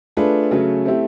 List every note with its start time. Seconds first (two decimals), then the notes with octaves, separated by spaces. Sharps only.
0.17 A3 D4 F4 G#4 B4
0.51 C#3 F#3 A3 C#4
0.85 A3 C4 E4 G4